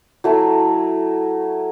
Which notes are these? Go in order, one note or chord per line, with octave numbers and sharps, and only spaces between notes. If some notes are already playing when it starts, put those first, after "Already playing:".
F#3 A3 E4 A#5